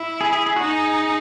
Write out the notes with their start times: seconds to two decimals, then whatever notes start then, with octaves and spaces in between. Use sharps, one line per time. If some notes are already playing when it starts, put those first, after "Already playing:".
Already playing: E4
0.21 G#4
0.33 G#4
0.46 G#4
0.56 D#4 F#4
0.67 G#4